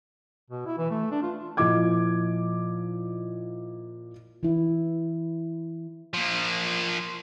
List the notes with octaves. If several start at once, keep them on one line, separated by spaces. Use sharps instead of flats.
B2
E4
E3
A3
D4
F4
A#2 F3 E4 D#5 D6 G#6
E3 E4
F3 A#3